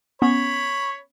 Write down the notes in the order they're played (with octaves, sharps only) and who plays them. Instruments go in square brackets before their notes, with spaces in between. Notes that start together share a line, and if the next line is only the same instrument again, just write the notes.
[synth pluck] B3 C#4 [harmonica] C#5 B5